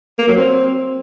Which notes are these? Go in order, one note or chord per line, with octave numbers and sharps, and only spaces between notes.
A#3
F#3
C4